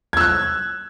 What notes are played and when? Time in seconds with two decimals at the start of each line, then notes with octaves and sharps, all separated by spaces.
0.13 G#6
0.17 E6
0.21 F#6